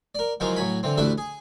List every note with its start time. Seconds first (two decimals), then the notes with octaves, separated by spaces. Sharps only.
0.15 A#4 D5
0.40 D#3 F3 F#3 G#3 E4 F4
0.56 A2 F#3 G#5 B5
0.83 D3 E3 C4
0.98 A1 D2 D4 E4 B4 E5
1.18 G#4